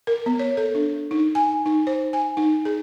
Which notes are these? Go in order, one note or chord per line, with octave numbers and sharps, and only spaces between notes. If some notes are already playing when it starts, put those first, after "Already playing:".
A#4
B3
C#5
A4
D4
D#4
G#5
D#4
C5
G#5
D#4
G#4